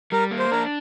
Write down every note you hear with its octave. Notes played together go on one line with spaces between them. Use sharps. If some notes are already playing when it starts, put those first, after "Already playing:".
G3 A#4
A#3
C5
D4 A#4